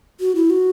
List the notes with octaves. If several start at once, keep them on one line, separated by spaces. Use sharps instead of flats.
F#4
E4
F#4